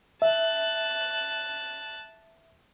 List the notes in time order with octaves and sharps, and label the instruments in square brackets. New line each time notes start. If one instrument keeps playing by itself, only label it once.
[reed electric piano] E5 [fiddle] A5 F#6